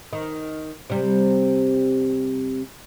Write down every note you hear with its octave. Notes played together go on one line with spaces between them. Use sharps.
D#3
C3 G3